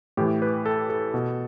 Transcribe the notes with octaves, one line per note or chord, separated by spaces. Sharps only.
A2 E3 G4
B4
A4
A4
B2